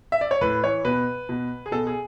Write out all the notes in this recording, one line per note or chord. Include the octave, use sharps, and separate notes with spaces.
E5
D5
C#5
A2 B4
E3 C#5
B2 B4
B2
G#4
B2 A4
G#4